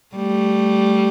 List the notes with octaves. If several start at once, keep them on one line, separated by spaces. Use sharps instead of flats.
G3 A3